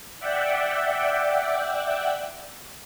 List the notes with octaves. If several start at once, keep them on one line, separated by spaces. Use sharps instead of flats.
D5 E5 F#5 G5